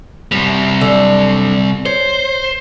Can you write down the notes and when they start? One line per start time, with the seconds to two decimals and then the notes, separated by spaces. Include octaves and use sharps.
0.32 F#2 C3 G3
0.81 F#2 D3
1.86 C5 C#5